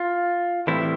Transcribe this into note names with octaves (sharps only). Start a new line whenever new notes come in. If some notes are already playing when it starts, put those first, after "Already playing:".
Already playing: F4
A2 E3 G3 C4 E4